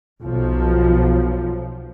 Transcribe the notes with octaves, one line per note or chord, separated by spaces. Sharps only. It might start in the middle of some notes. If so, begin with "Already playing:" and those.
B1 F3